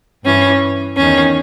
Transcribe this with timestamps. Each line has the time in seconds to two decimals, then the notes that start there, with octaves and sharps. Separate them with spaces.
0.23 G2 E3 C#4
0.97 E2 D#3 C#4